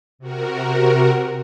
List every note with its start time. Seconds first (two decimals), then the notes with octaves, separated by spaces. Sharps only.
0.19 C3 F#4 A#4